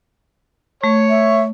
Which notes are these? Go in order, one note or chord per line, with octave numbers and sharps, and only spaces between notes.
A3 C#5
E5